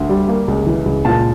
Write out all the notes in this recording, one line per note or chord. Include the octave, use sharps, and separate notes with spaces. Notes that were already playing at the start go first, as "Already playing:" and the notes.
Already playing: D2
G3
A#3
C#2
E3
C#2
A#2 A5